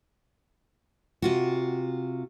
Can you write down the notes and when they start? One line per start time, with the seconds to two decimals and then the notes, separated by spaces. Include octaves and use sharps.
1.22 C3 F4 F#4